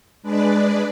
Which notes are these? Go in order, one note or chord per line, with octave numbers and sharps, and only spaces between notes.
G#3 D4 B4 D5